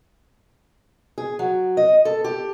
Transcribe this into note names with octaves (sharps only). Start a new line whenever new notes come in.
G#4
F#3
D#5
A4
G4